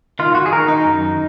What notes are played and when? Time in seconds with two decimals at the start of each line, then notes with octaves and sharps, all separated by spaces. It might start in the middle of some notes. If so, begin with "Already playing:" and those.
0.19 D#3 F4
0.35 F#4
0.46 G#4
0.52 D#3 A#4
0.68 D#4
0.84 F#2